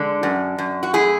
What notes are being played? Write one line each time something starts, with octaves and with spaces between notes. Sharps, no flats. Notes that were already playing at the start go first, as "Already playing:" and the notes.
Already playing: D3 G#3 D4
F#2
F#2
F#4
A3 E4 G#4